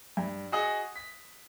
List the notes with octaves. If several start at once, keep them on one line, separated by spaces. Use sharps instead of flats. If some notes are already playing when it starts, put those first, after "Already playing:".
G2
F#4 G#4 D#5 F#5
B6